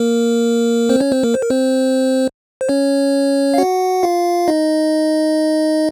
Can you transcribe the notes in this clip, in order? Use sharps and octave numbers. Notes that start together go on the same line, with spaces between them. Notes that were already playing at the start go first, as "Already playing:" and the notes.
Already playing: A#3 A#4
C4 C5
C#4 C#5
C4 C5
A#3 A#4
C5
A#4
C4 C5
C5
C#4 C#5
F5
F#4 F#5
F4 F5
D#4 D#5